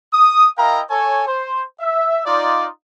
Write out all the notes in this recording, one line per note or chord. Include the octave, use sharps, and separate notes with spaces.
D#6
E4 A#4 D#5 F5 G5 A#5
A4 C#5 G#5
C5
E5
D#4 F4 D5